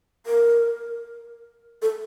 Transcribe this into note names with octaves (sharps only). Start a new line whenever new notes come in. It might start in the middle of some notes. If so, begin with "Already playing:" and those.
A#4
A4